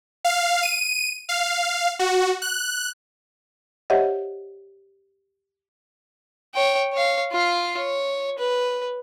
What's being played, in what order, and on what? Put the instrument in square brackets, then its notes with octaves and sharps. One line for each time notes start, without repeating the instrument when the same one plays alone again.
[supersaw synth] F5
D#7
F5
F#4
F#6
[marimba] G4 C5 C#5 D#5 E5 F#5
[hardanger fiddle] C#5 G5
C#5 F5
F4 F5
C#5
B4